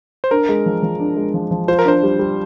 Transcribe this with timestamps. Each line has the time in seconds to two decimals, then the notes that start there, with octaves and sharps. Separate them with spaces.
0.24 C5
0.31 D4 A#4
0.49 G#3
0.66 F3
0.83 F3
1.00 D4
1.17 G#3
1.34 F3
1.51 F3
1.68 F4 C5
1.79 A#4
1.85 D4 C5
2.03 G3
2.19 G3